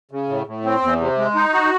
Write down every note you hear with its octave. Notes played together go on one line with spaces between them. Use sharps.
C#3
A2
A2
C4
E2
C3
G#3
D#4
F#4